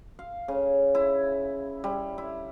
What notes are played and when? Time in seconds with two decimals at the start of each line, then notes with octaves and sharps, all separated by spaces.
0.19 F5
0.48 C#3
0.95 E4
1.84 G3
2.18 E4